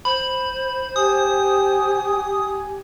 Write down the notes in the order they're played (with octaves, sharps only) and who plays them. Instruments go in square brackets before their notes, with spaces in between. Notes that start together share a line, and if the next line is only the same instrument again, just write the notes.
[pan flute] C5 [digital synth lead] B5
[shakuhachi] G4 [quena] G#5 [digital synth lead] D#6